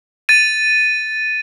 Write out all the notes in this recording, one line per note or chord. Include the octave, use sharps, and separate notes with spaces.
A6 D#7